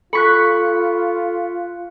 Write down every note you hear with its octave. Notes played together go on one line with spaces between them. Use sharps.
F4 A4 B5 C#6 F#6 B6 C#7